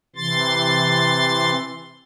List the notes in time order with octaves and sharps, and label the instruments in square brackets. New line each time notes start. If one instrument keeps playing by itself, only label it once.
[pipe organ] C3 E3 C6 A6